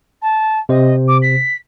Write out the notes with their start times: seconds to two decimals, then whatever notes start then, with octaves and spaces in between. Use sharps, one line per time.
0.22 A5
0.69 C3 C5 D#5
1.08 D6
1.22 B6